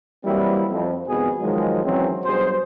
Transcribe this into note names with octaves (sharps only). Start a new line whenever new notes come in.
E3 F#3 G3 A#3 C4 E4
F2
G#1 F2 B2 G#4
D#3 F3 F#3 G#3
G#1 E3 F#3 G#3 C4 C#4
G2 B2 F#3 G#4 C5